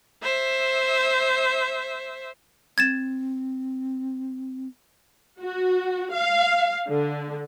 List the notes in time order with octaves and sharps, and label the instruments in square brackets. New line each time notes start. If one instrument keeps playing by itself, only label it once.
[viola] C5 E5
[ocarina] C4 [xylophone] G#6 A6 E7
[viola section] F#4
F5
D3